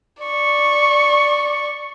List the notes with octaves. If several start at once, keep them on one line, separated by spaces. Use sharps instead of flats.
D5 C#6